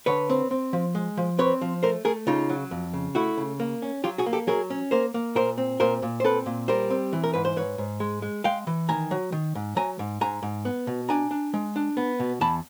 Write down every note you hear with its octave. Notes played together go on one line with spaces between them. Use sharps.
D3 B4 C#5
C4
C4
F3
G#3
F3
C4 B4 C#5
F3
A3 A#4 C5
A3 G#4 A#4
C#3 D#4 F4
F#3
F2
C#3
A3 E4 F#4
C#3
A#3
C#4
F#3 F4 G4
F#4 G#4
A#3
G4 A4
F#3 G#4 A#4
C#4
A#3 A#4 C5
A#3
A#2 A#4 C5
C4
A#2 A#4 C5
A#2
C5
C4 A4 B4
A#2
G3 A#4 C5
C4
E3
A#4
G#2 B4
C5
G#2 B4 C#5
G#2
G#3
G#3
G#3 F5 G5
E3
D#3 G#5 A#5
F#3
D#3
G#2
F#3 G#5 A#5
G#2
G#2 G#5 A#5
G#2
B3
B2
D4 G#5 A#5
D4
G#3
D4
B3
B2
E2 A5 B5